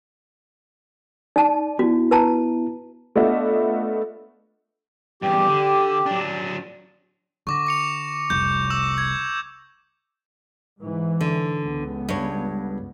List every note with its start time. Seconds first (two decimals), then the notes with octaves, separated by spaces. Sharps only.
1.36 D#4 D5 A5
1.79 B3 E4 F#4
2.11 B4 A5 A#5
3.15 A3 B3 D4 F4 D#5 E5
5.22 E2 G2 G4
5.48 D3
6.06 F#3 D4
7.47 D3 C#6 D6 A#6
7.67 D6 C#7 F7
8.30 F1 C2 G6
8.70 D6 E6 E7
8.98 G#6
10.80 G#2 E3
11.21 D3
11.61 C#2 B3
12.09 G2 C#5